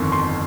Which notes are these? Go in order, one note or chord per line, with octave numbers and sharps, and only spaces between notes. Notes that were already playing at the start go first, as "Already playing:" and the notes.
Already playing: G1 F2 D#3 C6 C#6
C6